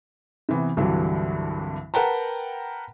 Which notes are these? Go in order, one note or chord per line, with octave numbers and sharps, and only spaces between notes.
C3 E3 B3
C2 G2 D3 E3 F#3
A#4 B4 F#5 G5 A5 A#5